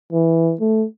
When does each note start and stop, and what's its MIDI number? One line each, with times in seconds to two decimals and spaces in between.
0.12 0.54 52
0.60 0.85 57